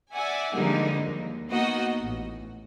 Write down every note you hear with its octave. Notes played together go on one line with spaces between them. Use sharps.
D5 E5 F#5 G#5
D3 F3 G3 G#3 A#3 D#4
D#2
A#3 B3 D#4 F#4 D#5
A1